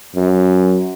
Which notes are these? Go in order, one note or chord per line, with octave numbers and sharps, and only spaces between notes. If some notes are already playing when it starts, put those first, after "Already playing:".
F#2